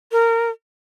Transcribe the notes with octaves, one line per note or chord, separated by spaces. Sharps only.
A#4